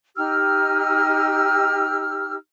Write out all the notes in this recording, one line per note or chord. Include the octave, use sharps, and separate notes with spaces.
D#4 G4 E6 F6